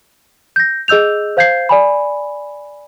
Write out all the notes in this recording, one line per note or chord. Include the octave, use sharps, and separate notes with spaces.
G6 A#6
G#4 D#5 E6 G6 F7
C5 F5 G6 G#6 C7
D5 G#5 B5